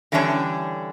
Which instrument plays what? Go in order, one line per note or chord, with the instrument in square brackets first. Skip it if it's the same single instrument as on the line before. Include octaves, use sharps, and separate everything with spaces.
[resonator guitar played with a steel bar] D3 E3 G3 C#4 D4 C#5